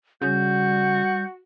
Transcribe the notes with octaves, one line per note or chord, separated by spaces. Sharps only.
C#3 G3 F#4 G6